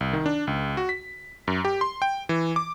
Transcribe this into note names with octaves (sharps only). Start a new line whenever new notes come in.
C2
D#3
D4
C#2
F#4
B6
F#2
G4
C6
G5
E3
D6